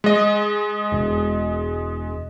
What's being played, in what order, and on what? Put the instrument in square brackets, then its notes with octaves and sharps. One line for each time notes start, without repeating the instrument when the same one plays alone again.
[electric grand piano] G#3 D#5
[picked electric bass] E1